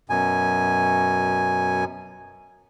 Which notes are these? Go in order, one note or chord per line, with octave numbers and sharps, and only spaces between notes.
F#2 B2 G#5